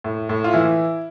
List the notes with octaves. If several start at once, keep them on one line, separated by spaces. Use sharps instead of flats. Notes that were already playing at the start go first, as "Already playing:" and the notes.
A2
A2
F4
E3 E4